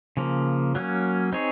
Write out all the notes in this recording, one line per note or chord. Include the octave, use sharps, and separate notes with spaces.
C#3 F3 A#3
F#3 A#3 C#4
C4 D#4 G#4 C#5